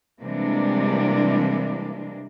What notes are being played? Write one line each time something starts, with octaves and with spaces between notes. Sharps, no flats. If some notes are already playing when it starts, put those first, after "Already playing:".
C3 E3 G3 G#3 A#3 D4